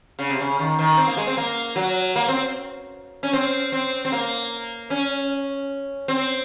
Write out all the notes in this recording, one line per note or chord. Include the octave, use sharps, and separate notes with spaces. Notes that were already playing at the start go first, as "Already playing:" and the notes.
C#3
C3
C#3
D#3
D#3
C4
A#3
G#3
C4
A#3
F#3
A#3
C4
C#4
C4
C4
C4
A#3
C#4
C4